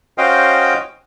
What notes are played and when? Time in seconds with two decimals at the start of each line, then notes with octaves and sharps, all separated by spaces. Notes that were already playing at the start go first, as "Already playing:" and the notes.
0.18 C#4 F#4 C5 D#5 F5 G5